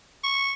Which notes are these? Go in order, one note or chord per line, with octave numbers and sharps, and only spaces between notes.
C#6